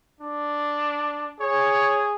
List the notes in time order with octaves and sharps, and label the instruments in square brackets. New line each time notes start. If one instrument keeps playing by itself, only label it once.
[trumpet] D4
[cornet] G#4 [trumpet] C#5